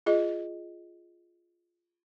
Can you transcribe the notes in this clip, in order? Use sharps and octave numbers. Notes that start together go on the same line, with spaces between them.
F4 G#4 D#5